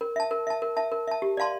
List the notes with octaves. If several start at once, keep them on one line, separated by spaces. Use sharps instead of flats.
A#4
E5 A5
A#4
E5 A5
A#4
E5 A5
A#4
E5 A5
G4
D5 F5 A5 C6